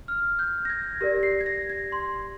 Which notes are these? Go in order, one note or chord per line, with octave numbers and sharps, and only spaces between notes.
F6
G6
A#6
G#6
G4 A#4 D5 A#6
C7
G#6
A#6
G#6
C6